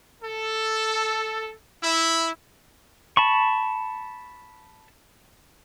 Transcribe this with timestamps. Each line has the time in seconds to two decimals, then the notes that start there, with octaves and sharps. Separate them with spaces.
0.23 A4
1.83 E4
3.17 A5 B5 C#6